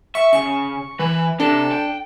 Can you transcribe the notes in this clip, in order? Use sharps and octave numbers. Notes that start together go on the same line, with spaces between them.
E5 C#6
C#3 C#6
E3 B4
C3 D4 A4
G5